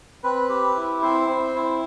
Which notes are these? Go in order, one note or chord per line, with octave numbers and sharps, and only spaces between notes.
C4 B4
G4
E4
C4 C5
C4
E4